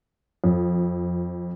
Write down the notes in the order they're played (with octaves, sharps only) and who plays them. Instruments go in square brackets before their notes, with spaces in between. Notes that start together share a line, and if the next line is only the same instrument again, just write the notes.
[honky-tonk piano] F2